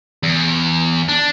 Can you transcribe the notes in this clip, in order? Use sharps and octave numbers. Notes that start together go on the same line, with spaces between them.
E2
D4